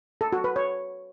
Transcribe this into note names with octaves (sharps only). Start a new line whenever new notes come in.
A4
F#4
B4
C#5